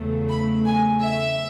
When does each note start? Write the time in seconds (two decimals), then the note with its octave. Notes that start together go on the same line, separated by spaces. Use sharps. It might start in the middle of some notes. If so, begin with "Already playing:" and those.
Already playing: E2 C#3 F#3 A3
0.29 B5
0.65 G#5
1.01 E5